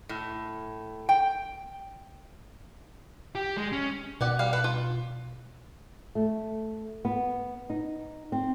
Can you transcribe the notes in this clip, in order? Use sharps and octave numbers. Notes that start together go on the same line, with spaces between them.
A2
G5
G4
G#3
C#4
B2 D#3 D5 F#5
G3 F5
A4 B4
F4
A3
B3
D#4
C4